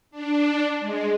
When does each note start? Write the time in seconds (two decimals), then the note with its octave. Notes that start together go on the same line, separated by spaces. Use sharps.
0.11 D4
0.79 G#3